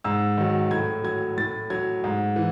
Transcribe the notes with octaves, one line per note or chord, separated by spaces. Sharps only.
G#2 E6
D#3 F#3
A2 G#6
F#3 G#6
A2 A6
F#3 G#6
G#2
E3